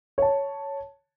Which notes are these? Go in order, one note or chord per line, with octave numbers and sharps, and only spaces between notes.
C#5 A5